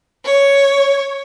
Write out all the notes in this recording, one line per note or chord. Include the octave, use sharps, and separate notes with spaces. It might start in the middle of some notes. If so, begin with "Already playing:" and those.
C#5